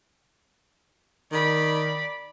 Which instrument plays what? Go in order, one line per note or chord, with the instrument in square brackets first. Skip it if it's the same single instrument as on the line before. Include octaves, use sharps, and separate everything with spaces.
[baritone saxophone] D#3 [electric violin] D5 B5